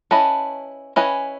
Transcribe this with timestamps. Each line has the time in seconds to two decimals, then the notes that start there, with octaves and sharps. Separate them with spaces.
0.11 C#4 E4 B4 D#5 A5
0.96 C#4 E4 B4 D#5 G#5